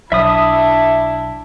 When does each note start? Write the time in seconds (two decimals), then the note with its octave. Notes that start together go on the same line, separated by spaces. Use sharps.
0.12 B1 D4 E4 E5 B5 D#6